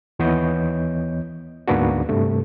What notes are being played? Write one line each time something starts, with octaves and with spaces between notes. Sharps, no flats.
D#2 E3 B3 C#5 D#5 G6
D2 G#2 A#3 B3 D4 F#4
G2 C3 A3